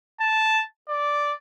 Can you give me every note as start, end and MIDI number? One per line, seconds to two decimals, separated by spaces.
0.20 0.62 81
0.88 1.33 74